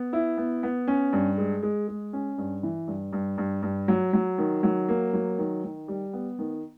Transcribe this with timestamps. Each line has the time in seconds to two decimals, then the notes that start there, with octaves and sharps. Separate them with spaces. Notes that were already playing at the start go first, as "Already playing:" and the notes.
Already playing: B3
0.13 E4
0.37 B3
0.63 B3
0.88 C#4
1.13 G2
1.38 G#3
1.63 G#3
1.88 G#3
2.13 C#4
2.38 G2
2.63 E3
2.88 G2
3.13 G2
3.38 G2
3.62 G2
3.88 F#3
4.13 F#3
4.38 D#3
4.63 F#3
4.88 A#3
5.13 F#3
5.38 D#3
5.63 D#3
5.88 G3
6.13 B3
6.39 D#3